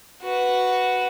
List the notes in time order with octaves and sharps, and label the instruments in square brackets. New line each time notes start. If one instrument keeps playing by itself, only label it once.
[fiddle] F#4 B4